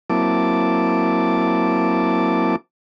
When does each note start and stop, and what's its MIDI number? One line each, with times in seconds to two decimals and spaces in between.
0.10 2.56 54
0.10 2.56 58
0.10 2.56 60
0.10 2.56 64
0.10 2.56 81
0.10 2.56 86